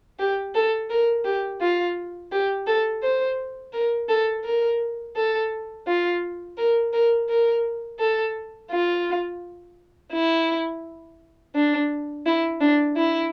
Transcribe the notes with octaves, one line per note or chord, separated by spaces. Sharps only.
G4
A4
A#4
G4
F4
G4
A4
C5
A#4
A4
A#4
A4
F4
A#4
A#4
A#4
A4
F4
E4
D4
E4
D4
E4